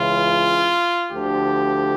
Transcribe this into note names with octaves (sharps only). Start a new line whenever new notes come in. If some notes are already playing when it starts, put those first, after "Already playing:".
Already playing: C#2 C#3 E3 F4
D2 D3 F3 G4